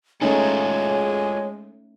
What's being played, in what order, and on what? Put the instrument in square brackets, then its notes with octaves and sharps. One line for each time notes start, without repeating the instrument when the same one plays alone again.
[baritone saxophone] G#3 [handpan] A3 C#4 D#4 [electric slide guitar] F4 G#4 A4 [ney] C#5